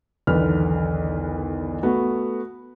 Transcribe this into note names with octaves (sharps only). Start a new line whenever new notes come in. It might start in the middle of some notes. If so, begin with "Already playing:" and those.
B1 E2 D3 D#3 B4 F6
A3 B3 F#4